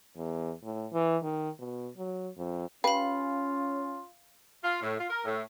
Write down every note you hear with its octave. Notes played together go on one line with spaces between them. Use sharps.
E2
A2
E3
D#3
B2
F#3
F2
C#4 F4 G4 B4 F5 B5
F4
A2
F4
A#4
A2